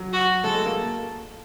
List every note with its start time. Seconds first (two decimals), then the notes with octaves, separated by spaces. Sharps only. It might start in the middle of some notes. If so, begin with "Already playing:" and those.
Already playing: F#3
0.13 F#4
0.44 G#3 A4
0.55 A3
0.66 A#3